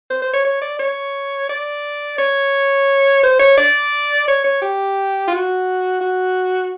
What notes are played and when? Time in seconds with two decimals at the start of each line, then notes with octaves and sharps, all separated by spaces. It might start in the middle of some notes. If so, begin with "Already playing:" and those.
0.10 C5
0.22 C5
0.33 C#5
0.45 C#5
0.61 D5
0.79 C#5
1.49 D5
2.19 C#5
3.23 C5
3.39 C#5
3.58 D5
4.28 C#5
4.44 C#5
4.62 G4
5.28 F4
5.31 F#4
6.01 F#4